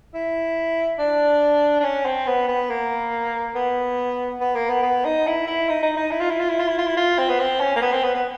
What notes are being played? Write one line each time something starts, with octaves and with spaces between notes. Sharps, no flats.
E4
D4
D4
C#4
C4
B3
B3
A#3
B3
B3
A#3
B3
B3
D#4
E4
E4
D#4
D#4
D#4
E4
F4
E4
F4
E4
F4
E4
F4
E4
F4
C4
B3
C4
C#4
A#3
B3
C4
B3
B3